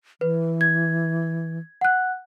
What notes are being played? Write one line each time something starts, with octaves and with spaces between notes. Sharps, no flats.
E3 B4
G#6
F#5 F#6